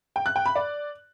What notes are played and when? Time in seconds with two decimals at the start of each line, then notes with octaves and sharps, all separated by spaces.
0.16 G5
0.26 F#6
0.36 G5
0.46 B5
0.56 D5